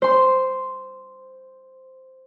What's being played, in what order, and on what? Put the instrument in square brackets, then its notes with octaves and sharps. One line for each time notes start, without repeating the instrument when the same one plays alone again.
[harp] C5 C6